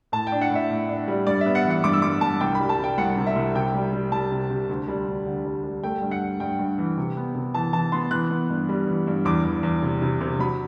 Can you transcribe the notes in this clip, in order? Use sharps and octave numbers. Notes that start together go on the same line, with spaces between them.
A2 A5
G5
D4
F#5
A2 E5
A2
D4
G3
G2 D5
E5
B3
F#5
E3
F#5
G2 D6
E6
G2 D6
G2 A5
C2 G5
B5
G3
A5
C3
G5
C2 F#5
C3
E5
C2
C3 G5
G3
G3
G3 A5
C3
C3
D2
G3
D2
D3
G3
G3
A3 G5
G2
F#5
G2
G2 G5
G2
E3
C3
B3
C3
E3 A5
E3 A5
B3 C6
E3 F#6
B3
G2
G3
E3
G2
E2 D6
E2
E2
C3
C3
C3
F#3 B5